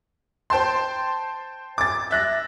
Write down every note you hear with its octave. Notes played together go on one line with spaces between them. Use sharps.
C5 G5 A5 C6
D6 A6
E5 F#6 A#6